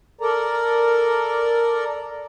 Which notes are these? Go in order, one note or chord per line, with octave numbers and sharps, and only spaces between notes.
A4 A#4 D5 A#5